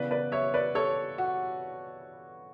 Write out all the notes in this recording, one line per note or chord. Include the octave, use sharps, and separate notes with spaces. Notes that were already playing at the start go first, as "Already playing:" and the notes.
Already playing: C#3 E3 B3 B4 D5
B4 D5
C#5 E5
B4 D5
A4 C#5
F#4